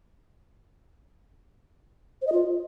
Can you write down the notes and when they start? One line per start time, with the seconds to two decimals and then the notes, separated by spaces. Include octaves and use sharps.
2.22 C5
2.27 D#5
2.32 F4